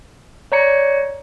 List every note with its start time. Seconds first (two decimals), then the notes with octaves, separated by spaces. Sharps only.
0.52 C#5 D5 A#5 G#6 C#7